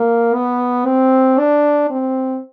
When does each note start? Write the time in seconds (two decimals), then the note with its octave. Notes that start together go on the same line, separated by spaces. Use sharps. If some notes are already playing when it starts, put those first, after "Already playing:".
Already playing: A#3
0.34 B3
0.86 C4
1.38 D4
1.90 C4